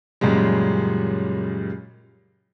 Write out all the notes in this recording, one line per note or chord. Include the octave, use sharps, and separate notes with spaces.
F#2 A#2 C#3 G3 G#3